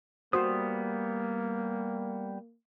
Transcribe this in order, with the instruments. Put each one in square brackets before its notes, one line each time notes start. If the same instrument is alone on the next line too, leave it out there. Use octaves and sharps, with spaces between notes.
[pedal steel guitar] G3 B3 D#6 [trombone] A#3 [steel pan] F#4 C5